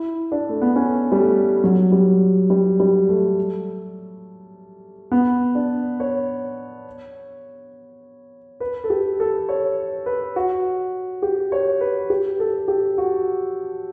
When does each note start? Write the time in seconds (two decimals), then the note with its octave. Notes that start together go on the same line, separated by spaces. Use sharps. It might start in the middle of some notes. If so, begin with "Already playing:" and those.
Already playing: E4
0.32 D4
0.49 A3
0.62 B3
0.76 C#4
1.12 G3
1.19 A3
1.64 F#3
1.92 G3
2.50 G3
2.80 G3
3.09 A3
5.11 B3
5.55 D4
6.00 C#5
8.60 B4
8.84 A4
8.90 G4
9.20 A4
9.49 C#5
10.06 B4
10.36 F#4
11.22 G4
11.52 C#5
11.81 B4
12.10 G4
12.40 A4
12.68 G4
12.98 F#4